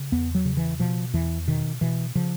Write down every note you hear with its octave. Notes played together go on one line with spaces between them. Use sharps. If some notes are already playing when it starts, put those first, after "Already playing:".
Already playing: C#3
E2 B3
F#3
C#3
E3
B2 F3
E2 E3
B2 D#3
B2 E3
C#3 F3